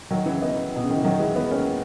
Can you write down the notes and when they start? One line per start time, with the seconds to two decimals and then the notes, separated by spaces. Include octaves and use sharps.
0.10 D#3 F#3
0.25 C#3 E3
0.42 B3 D#4
0.76 B2
0.83 C#3
0.90 D#3
0.97 E3
1.04 D#3 F#3
1.19 E3 G#3
1.35 G#3 B3
1.51 A#3 C#4